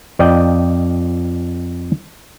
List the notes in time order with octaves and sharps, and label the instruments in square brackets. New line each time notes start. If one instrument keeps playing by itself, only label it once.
[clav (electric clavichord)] F2 D5 D#5 G5